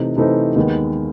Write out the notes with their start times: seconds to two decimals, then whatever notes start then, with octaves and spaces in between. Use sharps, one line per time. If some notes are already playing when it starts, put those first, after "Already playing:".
Already playing: C3 E3 A3 C4 D#4
0.17 C3 E3 A3 C4 D#4
0.56 D#2 D#3 G#3 B3